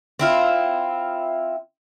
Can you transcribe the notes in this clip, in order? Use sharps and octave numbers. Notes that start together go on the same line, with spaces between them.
C4 E4 F4